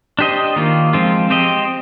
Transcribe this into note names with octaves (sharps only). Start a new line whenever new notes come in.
D4 G4 C5 D#5
D#3 A#3 F4
F3 G#3 C4 F4
C4 G4 C5 D#5